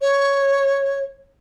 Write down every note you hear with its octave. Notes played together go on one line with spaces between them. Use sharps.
C#5